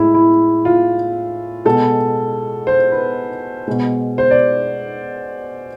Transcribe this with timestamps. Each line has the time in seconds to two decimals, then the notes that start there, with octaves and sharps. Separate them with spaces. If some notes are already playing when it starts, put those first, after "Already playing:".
Already playing: A2 G#3 E4
0.14 E4
0.65 F4
1.65 B2 G#3 A4
2.67 C5
2.92 B4
3.68 B2 G#3
4.18 C5
4.31 D5